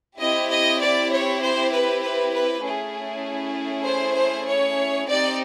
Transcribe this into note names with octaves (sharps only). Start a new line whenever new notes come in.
C4 E4 G4 D#5
D#5
D5
C#5
C5
B4
B4
B4
A3 C#4 E4 G#4
C5
C5
C#5
C4 D#4 G4 D5